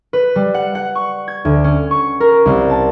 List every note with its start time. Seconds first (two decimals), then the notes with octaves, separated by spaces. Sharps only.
0.13 B4
0.36 G3
0.54 F#5
0.75 F#5
0.95 C#6
1.28 G#6
1.45 D2
1.64 C#4
1.91 C#6
2.20 A#4
2.46 C2
2.70 A5